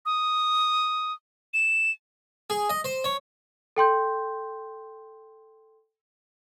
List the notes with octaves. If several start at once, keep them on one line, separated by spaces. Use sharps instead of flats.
D#6
E7
G#4
D#5
C5
C#5
A4 G5 C6 G6